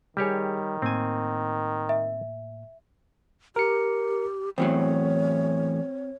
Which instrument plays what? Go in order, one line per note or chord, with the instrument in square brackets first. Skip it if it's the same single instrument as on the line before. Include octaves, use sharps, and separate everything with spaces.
[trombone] D#3 [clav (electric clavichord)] G3 G4 C#5 [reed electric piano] G#4 G5
[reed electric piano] A2 A#3 [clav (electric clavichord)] C4 G#5
[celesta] E5
[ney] G4 [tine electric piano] A#4 C#7
[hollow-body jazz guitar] E2 A2 F#3 [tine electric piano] C4 [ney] C#5